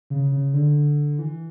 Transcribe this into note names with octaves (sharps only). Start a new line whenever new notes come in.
C#3
C#3
D3
E3